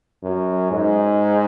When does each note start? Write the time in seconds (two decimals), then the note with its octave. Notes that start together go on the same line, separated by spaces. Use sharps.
0.23 F#2
0.71 G#2